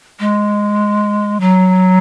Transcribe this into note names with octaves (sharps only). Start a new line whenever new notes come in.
G#3
F#3